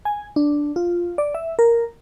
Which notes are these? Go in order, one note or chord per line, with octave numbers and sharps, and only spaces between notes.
G#5
D4
F4
D5
E5
A#4